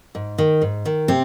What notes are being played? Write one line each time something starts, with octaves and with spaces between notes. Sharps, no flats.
G#2
D#3
G#2
D#3
C3 C4